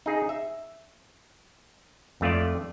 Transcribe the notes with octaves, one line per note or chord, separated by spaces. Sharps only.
D#4 G#4
E5
F2 A3 F4 D5